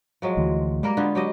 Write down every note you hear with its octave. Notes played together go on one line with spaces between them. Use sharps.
F3 F#3 G#3
D2 E3
G3 G#3 A#3 A#4
D3 B3 F4
F#3 G4 D#5